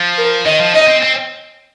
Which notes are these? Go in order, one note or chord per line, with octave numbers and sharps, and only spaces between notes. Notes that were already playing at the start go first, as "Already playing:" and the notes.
Already playing: F3
A#4
D#3 D#5
F3
D#4 D#5
C4
C4